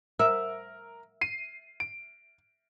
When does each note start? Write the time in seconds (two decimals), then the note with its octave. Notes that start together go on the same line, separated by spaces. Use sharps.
0.19 A#4 E5
1.21 C7 D#7
1.80 D7